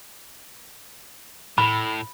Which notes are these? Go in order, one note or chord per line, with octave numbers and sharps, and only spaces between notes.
A2 B5